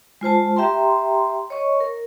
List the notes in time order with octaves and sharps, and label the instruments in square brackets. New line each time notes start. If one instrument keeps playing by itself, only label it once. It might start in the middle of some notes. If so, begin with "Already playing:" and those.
[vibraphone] G#3 F4 C5 A5
G4 E5 G5 A#5 C6
C#5 D#5 C#6
A#4